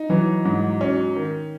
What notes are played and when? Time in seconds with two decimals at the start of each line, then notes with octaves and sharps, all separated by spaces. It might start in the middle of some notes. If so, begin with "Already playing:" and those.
Already playing: D#4
0.09 E3 F#3
0.45 G#2
0.81 C#4
1.16 D#3